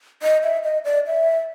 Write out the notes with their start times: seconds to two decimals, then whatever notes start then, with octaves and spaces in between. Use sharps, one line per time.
0.23 D#5
0.43 E5
0.64 D#5
0.85 D5
1.07 E5